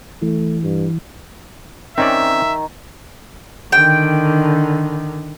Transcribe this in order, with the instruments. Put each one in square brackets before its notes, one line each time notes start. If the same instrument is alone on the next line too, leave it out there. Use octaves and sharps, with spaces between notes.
[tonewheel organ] E3 [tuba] A3
[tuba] G2
[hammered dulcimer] D#3 [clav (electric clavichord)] C4 C#4 D5 [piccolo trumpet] E5
[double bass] D3 D#3 [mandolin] G5